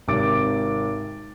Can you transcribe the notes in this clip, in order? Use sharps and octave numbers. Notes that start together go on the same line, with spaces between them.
G#1 C3 D6 A6 D7